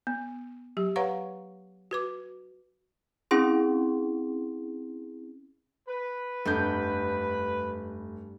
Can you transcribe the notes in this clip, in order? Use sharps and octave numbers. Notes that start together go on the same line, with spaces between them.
B3
F#3 G4
B4 C#5 F5 F#5 A#5 C#6
F#4 B4 D6
C4 C#4 E4 G#4 C6
B4
F1 G2 B3 G6